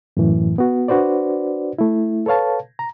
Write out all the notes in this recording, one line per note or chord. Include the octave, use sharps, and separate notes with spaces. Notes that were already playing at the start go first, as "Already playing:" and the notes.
F#2 A2 E3
B3 F#4
D4 F#4 B4 C5 D5
A3 E4
A4 B4 C#5 F5 A5
A#5